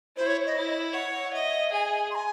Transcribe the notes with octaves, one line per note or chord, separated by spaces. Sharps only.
E4 C5
C#5
D#5
E4
C#5 F#5
F#5
D#5 E5
G#4 G#5
C6
G#5